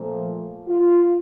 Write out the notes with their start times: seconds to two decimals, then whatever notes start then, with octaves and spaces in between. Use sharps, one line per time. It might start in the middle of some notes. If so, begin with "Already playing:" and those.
Already playing: A#2 F3 A3
0.68 F4